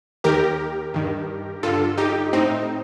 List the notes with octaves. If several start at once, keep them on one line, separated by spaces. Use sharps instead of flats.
D#2 D#3 G4 A#4
G2 D#3
G2 D3 F4 A4
D#4 G4
A2 C4 D#4